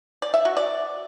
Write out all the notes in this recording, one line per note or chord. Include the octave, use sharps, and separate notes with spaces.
D5
E5
F#4
D5